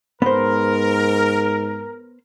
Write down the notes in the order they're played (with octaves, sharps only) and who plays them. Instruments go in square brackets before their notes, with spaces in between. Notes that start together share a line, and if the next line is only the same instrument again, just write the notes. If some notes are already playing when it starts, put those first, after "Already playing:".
[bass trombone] G#2 [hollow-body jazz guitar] B3 C5 [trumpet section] A#4